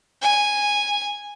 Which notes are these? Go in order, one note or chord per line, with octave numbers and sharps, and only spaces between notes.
G#5